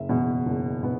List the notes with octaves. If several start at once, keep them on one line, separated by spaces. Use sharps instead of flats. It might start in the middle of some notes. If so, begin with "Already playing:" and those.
Already playing: F#1 E5
E2 B2 B3
F#1
B2 B3